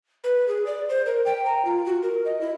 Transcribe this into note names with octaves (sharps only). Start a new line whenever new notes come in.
B4
G#4
D5
C5
A#4
G5
A#5
F4
F#4
A#4
D#5
E4